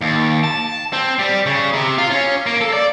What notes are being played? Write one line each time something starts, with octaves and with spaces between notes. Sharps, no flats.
D#2
A5
C4
G3
C#3
C3
F4
C#4
A#3
A4
D5